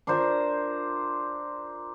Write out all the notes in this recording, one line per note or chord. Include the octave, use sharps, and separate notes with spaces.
D4 F4 A#4 C5